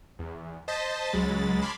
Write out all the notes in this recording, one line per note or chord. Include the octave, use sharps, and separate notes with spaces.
E2
C5 D#5 A5 G6 A6 B6
C#2 F#3 G#3 B5 A6
A5 B5 C6 D6 F6 G#6